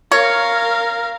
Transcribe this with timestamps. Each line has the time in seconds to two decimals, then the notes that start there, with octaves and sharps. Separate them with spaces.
0.12 A#4 C#5 F5